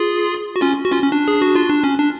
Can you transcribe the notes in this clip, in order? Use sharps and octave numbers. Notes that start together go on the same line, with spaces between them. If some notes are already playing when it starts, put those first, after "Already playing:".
Already playing: F4 G#4
F#4
C#4 F4
F#4
C#4 F4
C#4
D4
G#4
F#4
F4
D4
C#4
D4